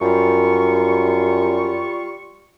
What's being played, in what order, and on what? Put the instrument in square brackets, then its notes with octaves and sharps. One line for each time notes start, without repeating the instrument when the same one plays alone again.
[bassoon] F#2 [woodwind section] G3 F4 C#6